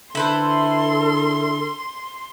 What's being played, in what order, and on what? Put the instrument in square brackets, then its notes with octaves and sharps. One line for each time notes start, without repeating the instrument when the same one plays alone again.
[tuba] D3 [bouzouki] E4 B4 C5 [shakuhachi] A4 [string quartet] C6